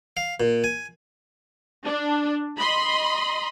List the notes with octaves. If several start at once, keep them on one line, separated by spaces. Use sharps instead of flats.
F5
A#2
G#5
D4
D#5 B5 C6